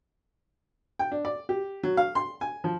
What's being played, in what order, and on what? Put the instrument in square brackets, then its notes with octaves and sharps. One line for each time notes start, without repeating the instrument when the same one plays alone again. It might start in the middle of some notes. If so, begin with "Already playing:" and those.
[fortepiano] G5
D4
D5
G4
F#3
F5
C6
G#5
F3